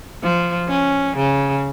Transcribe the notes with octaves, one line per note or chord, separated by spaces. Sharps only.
F3
C#4
C#3